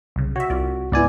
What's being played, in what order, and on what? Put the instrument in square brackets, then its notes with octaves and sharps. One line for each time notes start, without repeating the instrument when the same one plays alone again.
[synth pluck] C2 C#3
[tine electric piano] F#4 [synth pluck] C#5 E5
[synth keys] C2 [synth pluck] F4 D5
[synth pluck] C#2 [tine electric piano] G#2 D5 G#5 [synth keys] B3 E4